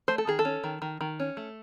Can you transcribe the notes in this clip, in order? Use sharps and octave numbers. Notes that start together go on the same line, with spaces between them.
A3 C5
A4
D#3 G#4
A4
C#4
D#3
D#3
D#3
C#4
A3